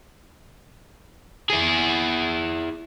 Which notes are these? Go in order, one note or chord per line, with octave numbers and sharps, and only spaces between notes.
E4 G#4